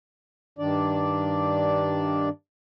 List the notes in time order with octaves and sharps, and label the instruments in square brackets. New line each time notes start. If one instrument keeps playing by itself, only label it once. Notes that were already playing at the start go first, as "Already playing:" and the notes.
[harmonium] G2 D#3 D4 D5